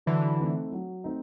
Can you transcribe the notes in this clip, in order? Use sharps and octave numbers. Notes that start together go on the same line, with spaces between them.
D3 E3 F#3
A3 C4 D#4
F#3
A3 C4 D#4